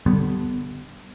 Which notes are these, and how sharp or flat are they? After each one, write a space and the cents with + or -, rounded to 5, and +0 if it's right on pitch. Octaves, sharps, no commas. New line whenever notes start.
D3 +0 G3 -15 B3 +0